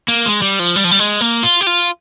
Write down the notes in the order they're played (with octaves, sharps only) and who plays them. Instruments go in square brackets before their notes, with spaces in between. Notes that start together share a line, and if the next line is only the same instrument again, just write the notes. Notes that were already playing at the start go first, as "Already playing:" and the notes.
[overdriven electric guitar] A#3
G#3
G3
F3
G3
F3
G3
G#3
A#3
F4
G4
F4